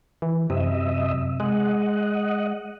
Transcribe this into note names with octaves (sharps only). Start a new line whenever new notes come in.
E3
F#2 C3 D#5 E5
G#3 D#5 F#5